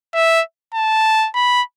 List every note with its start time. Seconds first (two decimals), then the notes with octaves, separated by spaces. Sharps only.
0.14 E5
0.74 A5
1.35 B5